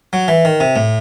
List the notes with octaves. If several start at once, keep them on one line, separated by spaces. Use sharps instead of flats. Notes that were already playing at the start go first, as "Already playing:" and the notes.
F#3
E3
D#3
C3
A2